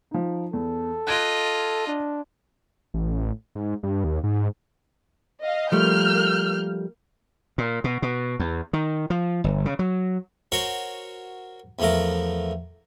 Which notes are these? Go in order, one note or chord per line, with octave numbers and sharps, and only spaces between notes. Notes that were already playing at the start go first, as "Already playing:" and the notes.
F3 D#4
E2 A4
F4 D#5 F#6 G#6 D7
D4
A1
G#2
G2
D#2
G#2
D#5 F5
F3 G3 A3 A#3 F6 G6
A#2
B2
B2
E2
D#3
F3
G1
C#3
F#3
F#4 A#4 C5 C#5 C#6
E2 F3 A3 A#4